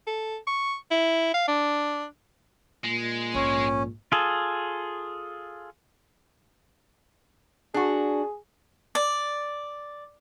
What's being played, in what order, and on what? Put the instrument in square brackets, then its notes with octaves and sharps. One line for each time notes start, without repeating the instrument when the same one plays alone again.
[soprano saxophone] A4
C#6
E4
F5
D4
[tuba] A#2 [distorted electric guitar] G#3
[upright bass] A#1 G#2 [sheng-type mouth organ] C#4
[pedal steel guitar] F4 G#4 A4
[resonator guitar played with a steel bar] D4 F#4 [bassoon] G#4
[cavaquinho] D5